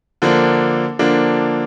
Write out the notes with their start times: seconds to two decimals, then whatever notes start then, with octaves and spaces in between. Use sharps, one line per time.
0.22 D3 F3 A#3 D4
0.99 D3 F3 A#3 D4